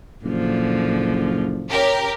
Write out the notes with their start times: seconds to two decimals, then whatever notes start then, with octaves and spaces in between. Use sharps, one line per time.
0.24 F#1 A#2 D3 F3
1.70 F#2 C#3 G4 A#4 C#5